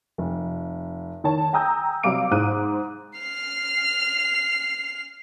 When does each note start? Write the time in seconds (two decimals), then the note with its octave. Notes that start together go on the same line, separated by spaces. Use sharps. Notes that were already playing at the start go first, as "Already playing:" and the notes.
0.18 F1
1.24 D#3 C#5 A5
1.53 G5 G#5 A#5 D#6 E6 G6
2.03 C3 F#3 G3 F5 D6 D7
2.31 G#2 C5 F#6 D#7
3.18 F6 C7